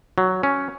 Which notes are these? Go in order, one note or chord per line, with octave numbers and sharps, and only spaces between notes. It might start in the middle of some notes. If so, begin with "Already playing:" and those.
F#3
C#4